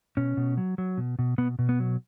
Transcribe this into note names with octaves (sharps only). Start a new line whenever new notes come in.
B2 C#4
B2
F#3
F#3
B2
B2
B2 B3
B2
B3
F#3